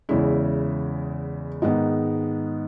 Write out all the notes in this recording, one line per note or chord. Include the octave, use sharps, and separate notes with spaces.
E2 C#3 G#3 E4
G#2 D#3 G#3 B3 D#4